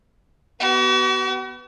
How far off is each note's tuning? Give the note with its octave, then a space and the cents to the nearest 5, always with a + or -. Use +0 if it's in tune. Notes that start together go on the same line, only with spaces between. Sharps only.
B3 +0 F#4 +45